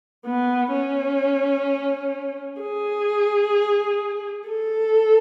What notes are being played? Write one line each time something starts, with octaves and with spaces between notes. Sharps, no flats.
B3
C#4
G#4
A4